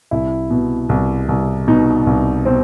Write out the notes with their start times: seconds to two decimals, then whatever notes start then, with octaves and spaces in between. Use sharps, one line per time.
0.11 C2 E4
0.50 B2
0.89 C2
1.29 C2
1.68 B2 D#4
2.07 C2
2.45 B2 C4